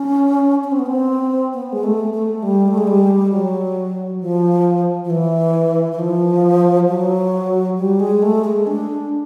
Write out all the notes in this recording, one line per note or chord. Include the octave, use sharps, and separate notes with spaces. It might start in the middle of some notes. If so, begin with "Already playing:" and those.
Already playing: C#4
C#4
C4
B3
C4
B3
G#3
A3
A3
G3
A3
G#3
G3
F#3
F3
F3
E3
E3
F3
F#3
G3
G#3
A3
G#3
D4